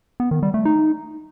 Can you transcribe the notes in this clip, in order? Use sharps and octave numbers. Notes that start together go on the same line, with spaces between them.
B3
D#3
G3
A3
D#4